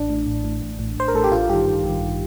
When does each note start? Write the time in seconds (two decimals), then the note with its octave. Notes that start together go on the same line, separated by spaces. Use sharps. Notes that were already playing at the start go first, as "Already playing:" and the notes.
Already playing: A1 D4
0.09 A2
0.27 A1
0.44 A2
0.62 A1
0.79 A2
0.97 A1 C5
1.08 A#4
1.14 A2 A4
1.24 G4
1.32 A1 F4
1.49 G2 D#3 G4
1.67 A1
1.84 G2 D#3